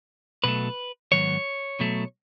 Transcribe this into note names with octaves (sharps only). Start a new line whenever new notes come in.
B2 F#3 A3 B4
G#2 D#3 F#3 B3 C#5
B2 F#3 A3